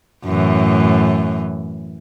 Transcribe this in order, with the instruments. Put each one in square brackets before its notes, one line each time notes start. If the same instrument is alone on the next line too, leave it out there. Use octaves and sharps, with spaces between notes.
[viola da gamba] F#2 A2 E3